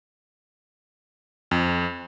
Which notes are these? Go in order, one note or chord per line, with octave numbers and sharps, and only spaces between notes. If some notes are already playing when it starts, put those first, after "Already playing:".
F2